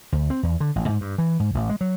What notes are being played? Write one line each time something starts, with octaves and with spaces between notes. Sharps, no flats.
D2
C4
E2
D3
A1
G#2
G2
E3
G#2
A1
G#3
F#3